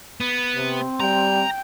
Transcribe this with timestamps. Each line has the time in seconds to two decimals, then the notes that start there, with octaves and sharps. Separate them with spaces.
0.20 B3
0.56 C3 C4
1.00 G3 G5 A#5